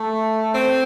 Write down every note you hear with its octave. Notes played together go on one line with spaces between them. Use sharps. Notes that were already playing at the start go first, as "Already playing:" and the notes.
Already playing: A3
C4